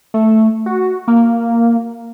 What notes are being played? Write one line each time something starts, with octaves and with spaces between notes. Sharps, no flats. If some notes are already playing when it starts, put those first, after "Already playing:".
A3
F#4
A#3